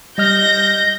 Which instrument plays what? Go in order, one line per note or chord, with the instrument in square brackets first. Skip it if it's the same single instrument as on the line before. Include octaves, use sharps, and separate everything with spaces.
[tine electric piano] G3 D#5 F6 [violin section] G6 A#6